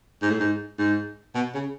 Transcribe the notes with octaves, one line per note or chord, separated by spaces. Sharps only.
G#2
A2
G#2
G#2
B2
C#3